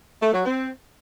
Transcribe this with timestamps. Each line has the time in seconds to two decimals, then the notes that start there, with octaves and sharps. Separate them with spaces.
0.22 A3
0.33 F#3
0.45 C4